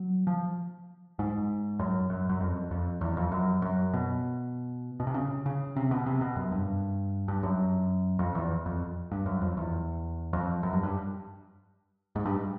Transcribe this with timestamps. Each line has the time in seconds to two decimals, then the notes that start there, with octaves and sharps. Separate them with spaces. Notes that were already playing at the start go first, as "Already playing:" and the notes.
Already playing: F#3
0.27 F3
1.19 G#2
1.79 F#2
2.10 F#2
2.29 F#2
2.40 F2
2.71 F2
3.01 E2
3.17 F2
3.32 F#2
3.62 F#2
3.94 B2
5.00 B2
5.07 C3
5.14 C#3
5.46 C#3
5.76 C3
5.91 B2
6.06 C3
6.21 B2
6.36 F#2
6.52 G2
7.28 G2
7.43 F#2
8.19 F2
8.35 E2
8.66 F2
9.12 G2
9.26 F#2
9.41 F2
9.57 E2
10.33 F2
10.63 F#2
10.73 G2
10.83 G2
12.16 G#2
12.26 G2